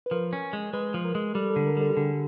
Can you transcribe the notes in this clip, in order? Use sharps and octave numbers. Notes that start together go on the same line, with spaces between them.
B4
F3 A#4
C#4
G#3
G#3 B4
F3
A#4
G#3
G3 A4
A4
D3
A#4
G3 A4
G4
D3 G#4